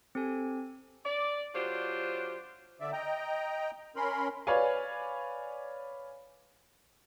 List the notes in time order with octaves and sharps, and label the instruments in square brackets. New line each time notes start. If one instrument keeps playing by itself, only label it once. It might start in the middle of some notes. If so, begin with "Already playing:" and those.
[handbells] C4 G4 A4 G#5
[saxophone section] D5
F#3 D4 F4 G4 C5
[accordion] D3 D5 E5
D#5 G5 A#5
C#4 A#4 B5 C6
[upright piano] B4 C#5 D5 F5 G#5